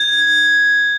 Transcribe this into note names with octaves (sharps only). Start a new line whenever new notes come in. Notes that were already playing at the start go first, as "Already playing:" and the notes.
Already playing: G#6